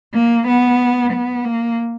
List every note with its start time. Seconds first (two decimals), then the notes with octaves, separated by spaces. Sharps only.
0.14 A#3
0.47 B3
1.12 B3
1.45 A#3